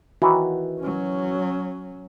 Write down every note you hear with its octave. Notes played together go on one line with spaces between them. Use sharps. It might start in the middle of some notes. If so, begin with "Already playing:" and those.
D#3 E3 F#4
F#3 C#4